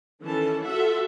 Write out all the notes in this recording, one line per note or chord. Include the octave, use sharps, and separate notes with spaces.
D#3 E3 C#4 A4 A5
F4 F#4 A4 E5 F#5